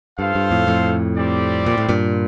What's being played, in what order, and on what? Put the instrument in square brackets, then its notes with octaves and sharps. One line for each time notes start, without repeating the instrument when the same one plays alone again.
[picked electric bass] G2 [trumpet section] F4 A4 C5 F5
[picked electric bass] G2
F2 A2
F2 A2
[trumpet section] G3 C4 G4 D5
[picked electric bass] A#2
A2
G2 A#2